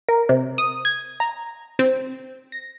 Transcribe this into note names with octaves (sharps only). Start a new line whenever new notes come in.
A#4
C3
D#6
G#6
A#5
C4
A#6